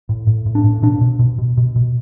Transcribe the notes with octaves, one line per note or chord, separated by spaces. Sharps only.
A2
A2
A2
D4
A2
B2 D4
B2
B2
B2
B2
B2